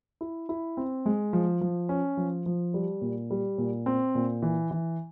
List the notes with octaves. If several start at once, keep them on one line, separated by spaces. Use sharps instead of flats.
E4
E4
C4
G#3
F3
F3
C#4
F3
F3
G3
A#2
G3
A#2
C4
A#2
E3
E3